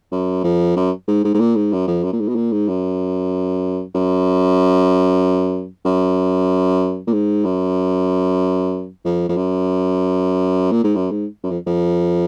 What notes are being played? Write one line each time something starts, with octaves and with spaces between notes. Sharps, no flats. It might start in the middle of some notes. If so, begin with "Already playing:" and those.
F#2
F2
F#2
G#2
G#2
G#2
A#2
G#2
F#2
F2
F#2
A#2
G#2
B2
A#2
G#2
F#2
F#2
F#2
A#2
G#2
F#2
F2
F2
F#2
A#2
G#2
F#2
G#2
F#2
F2
F2